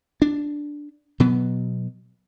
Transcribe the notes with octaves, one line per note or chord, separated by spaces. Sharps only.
D4
B2 F#3 B3